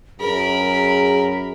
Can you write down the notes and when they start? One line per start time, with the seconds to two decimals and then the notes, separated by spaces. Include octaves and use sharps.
0.20 F#2 G#4 A#4 B5